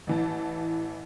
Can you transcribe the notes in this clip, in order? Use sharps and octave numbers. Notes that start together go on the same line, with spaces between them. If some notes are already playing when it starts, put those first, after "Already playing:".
A1 E3 A5